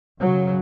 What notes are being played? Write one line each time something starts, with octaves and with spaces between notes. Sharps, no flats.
F#2 C#3 F#3